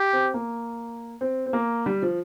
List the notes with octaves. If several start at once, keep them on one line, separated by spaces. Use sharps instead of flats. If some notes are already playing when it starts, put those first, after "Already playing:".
Already playing: G4
C4
A#3
C4
C4
A#3
G3
F3